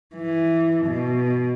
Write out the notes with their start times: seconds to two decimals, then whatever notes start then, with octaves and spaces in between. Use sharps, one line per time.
0.15 E3
0.86 B2